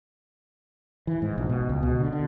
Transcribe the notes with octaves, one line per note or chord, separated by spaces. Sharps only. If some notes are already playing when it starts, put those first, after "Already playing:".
E3
G#2
A#1
B2
C#2
B2
D3
D3